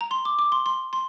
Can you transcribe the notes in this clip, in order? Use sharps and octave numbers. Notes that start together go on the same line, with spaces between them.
A#5
C6
D6
D6
C6
C6
C6